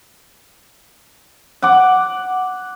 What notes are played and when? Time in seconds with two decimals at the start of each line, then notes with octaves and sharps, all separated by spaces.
1.62 F#5 D6